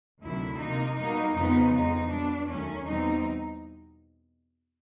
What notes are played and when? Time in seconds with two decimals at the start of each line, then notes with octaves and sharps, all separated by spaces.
0.22 D2 C3 D#3 F#3 E4
0.59 C3 F3 A#3 D#4
0.97 B2 G3 A#3 D#4
1.34 F2 C#3 F3 G#3 B3 D#4
1.72 F2 C#3 F3 G#3 D#4
2.09 B2 G3 B3 D4
2.47 D#2 D#3 F#3 A3 C#4
2.85 E2 B2 G3 C4 D#4